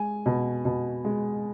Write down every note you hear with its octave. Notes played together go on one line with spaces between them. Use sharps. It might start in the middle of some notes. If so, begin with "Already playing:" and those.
Already playing: G#3 G#5
B2
B2
G#3